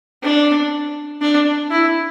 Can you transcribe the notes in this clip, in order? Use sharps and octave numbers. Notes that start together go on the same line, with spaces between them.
D4
D4
E4